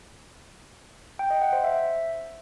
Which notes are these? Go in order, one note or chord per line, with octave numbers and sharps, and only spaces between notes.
G5
D#5
F#5
C5
E5